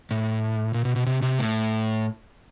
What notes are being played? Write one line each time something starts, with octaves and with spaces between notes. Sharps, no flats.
A2
A#2
B2
B2
C3
C3
A2